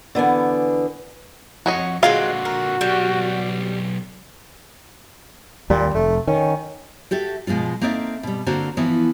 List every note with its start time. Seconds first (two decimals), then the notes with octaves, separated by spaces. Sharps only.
0.15 D3 E3 B3 G#5
1.66 F2 F#4 C#5 D#5
2.03 A#2 D3 F#3 G#3 C4 F4 F#4 F5
2.45 A#4
2.81 B1 G3 G4
5.70 D#2 A#2 G3
5.95 F1 A3
6.27 D#3 C#4
7.11 F#4 G4 A4 E5
7.47 B2 F3 G#3 B3 F4
7.81 A#3 C4 D#4 A4 C#5 E5
8.23 B2 G3
8.46 D3 A#3 C4 F#4 C5
8.77 E3 F3 B3